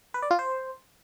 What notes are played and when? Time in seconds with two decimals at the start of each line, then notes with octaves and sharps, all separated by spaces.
0.14 B4
0.22 D5
0.31 F4
0.39 C5